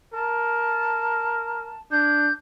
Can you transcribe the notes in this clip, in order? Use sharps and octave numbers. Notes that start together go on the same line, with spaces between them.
A#4 A5
D4 G6